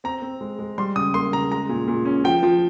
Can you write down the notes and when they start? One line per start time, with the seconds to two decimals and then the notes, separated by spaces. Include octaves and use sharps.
0.04 C4 A#5
0.22 C4
0.41 G#3
0.59 G#3
0.78 G3 C6
0.96 C#3 D#6
1.14 A#3 C6
1.32 C#3 A#5
1.51 G#3 A#5
1.69 A#2
1.88 A#2
2.05 C#4
2.24 F3 G5
2.43 F3